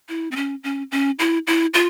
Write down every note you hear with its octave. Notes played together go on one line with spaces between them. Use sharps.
E4
C4
C#4
C#4
C#4
E4
E4
F4